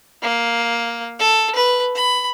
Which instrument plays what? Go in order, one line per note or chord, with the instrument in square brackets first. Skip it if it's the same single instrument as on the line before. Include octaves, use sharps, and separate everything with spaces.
[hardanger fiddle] A#3
A4
B4
B5